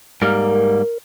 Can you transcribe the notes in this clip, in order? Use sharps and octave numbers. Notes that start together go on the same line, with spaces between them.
G#2 G3 A#3 A#4